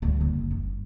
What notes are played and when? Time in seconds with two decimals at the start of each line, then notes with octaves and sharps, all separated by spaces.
0.02 D2 G3
0.21 F#1
0.51 G2